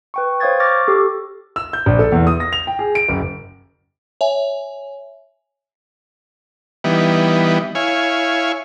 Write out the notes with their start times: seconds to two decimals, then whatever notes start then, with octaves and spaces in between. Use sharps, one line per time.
0.14 B4 G5 C#6
0.40 C5 C#5 F5 D#6 G#6 A6
0.60 C#6 D6 F6 A6 A#6
0.87 G4 A4 C#6
1.56 E6
1.73 G6
1.86 A#1
1.99 A4
2.12 E2
2.27 D#6
2.40 A#6
2.53 F7
2.67 G5
2.79 G#4
2.95 D7
3.08 F#1
4.21 C#5 E5 G#5
6.84 E3 G3 B3 D#4
7.75 E4 C#5 F5 G#5